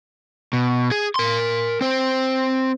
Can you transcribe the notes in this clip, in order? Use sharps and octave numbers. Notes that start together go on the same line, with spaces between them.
B2
G#4
A#4 C6
C4 C5